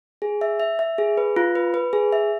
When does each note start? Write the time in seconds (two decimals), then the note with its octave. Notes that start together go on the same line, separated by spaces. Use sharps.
0.22 G#4
0.41 E5
0.60 E5
0.79 E5
0.98 G#4
1.17 B4
1.36 F4
1.55 B4
1.74 B4
1.93 G#4
2.12 E5